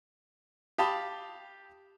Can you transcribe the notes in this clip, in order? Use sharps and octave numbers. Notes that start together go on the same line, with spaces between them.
G4 F5 G5 A5 B5 D#6